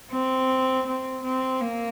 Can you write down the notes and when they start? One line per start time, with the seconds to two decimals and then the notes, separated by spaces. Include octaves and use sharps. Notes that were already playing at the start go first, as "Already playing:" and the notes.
0.11 C4
0.86 C4
1.23 C4
1.61 A#3